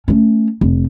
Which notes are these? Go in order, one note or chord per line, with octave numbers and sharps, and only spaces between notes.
A3 C#4
F1